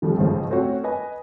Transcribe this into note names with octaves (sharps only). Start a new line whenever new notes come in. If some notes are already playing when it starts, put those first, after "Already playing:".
D3 F3 G3 A3 C4
A1 G#2 C#3 F3 C5
A3 C4 C#4 F#4
B4 D#5 G#5